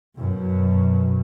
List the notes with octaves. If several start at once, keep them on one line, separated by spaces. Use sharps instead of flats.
F#2 B2